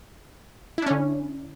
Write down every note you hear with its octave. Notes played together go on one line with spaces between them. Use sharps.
D3 C#4 D4 E4